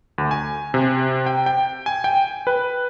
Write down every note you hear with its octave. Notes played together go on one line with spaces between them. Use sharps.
D2
G#5
C3
G5
G5
G#5
G5
B4